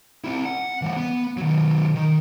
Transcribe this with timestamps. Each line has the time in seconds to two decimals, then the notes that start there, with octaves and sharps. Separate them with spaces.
0.24 C4 E4
0.45 F#5
0.82 E3 G3
0.97 B3
1.37 D#3 F#3
1.95 D#3